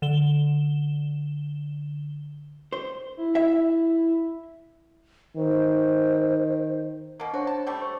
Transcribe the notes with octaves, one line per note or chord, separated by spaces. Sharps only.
D3 E7 G7
C5
E4
E5
D#3 C5
B2 A#3
D4 F#4 C5 C#5
A5
G3 A3 G4
C5 C#6